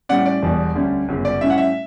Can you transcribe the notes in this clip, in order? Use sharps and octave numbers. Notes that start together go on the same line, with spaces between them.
A2 G3 C#4 D5 F#5
D5
E1 E2 B2 G3
D2 D3 G3 C#4
G1 F#2 C#3
D5
A2 G3 C#4 E4 E5
F#5
E5